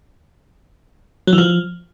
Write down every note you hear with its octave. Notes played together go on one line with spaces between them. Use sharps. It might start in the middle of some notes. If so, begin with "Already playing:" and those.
F#3
E3
F3